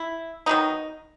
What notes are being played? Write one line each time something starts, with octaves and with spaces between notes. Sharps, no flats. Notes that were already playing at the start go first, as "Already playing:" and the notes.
Already playing: E4
D#3 F#3 B3 D#4